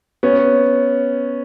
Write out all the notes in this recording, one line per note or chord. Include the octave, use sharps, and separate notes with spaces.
B3 C#4